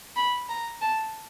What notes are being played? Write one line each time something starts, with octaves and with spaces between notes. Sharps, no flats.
B5
A#5
A5